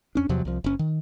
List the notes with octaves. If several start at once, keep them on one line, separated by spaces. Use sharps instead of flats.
F2 C#4 D4
E2 C3 F3 F#3
C2 F3
F#1 C#4
D#3